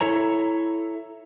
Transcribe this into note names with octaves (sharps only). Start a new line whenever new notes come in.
E4 A4 C#5 A#5